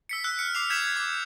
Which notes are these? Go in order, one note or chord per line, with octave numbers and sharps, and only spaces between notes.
E6 B6 C#7
E6 F#6
F6 C#7
D6 C7 F7
G6 G#6 B6 E7
D6 G6